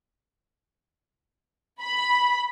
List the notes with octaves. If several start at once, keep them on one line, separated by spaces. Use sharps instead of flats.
B5